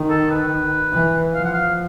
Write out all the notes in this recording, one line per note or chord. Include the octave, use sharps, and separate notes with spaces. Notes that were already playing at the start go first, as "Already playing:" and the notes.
Already playing: D#3
A4
B4
E3
F3 F5
F#5
F5